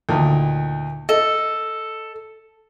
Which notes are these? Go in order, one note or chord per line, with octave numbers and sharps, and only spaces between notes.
D2 A#2 D#3
A4 D#5